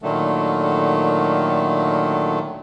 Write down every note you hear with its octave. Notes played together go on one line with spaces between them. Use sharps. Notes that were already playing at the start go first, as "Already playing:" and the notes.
A#2 D3 D#3 F#3 A3